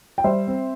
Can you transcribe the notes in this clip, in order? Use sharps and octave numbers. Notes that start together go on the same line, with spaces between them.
G5
G3 C5 E5
C4